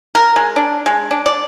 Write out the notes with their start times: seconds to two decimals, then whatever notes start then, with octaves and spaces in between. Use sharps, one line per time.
0.15 A#4
0.36 G#3
0.56 D4
0.86 G#3
1.11 D4
1.26 D5